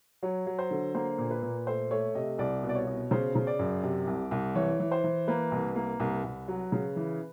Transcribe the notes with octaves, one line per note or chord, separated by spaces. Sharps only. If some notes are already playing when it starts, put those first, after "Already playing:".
F#3 C#5
F#3
C5
D3
A#3 C5
A#2
B4
A#2
A3 C5
A3 C#5
C3 D#5
C2 D5
B2
D5
C#5
B2
C#3 C5
C#3
D5
F#2
C3
C2
C2
E3 C#5
E3
C5
E3
A#3 B4
C2
A#3
C2
C2
F#3
C#3
E3